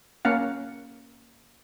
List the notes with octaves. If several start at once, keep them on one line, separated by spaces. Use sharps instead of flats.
A#3 C#4 F5 F#5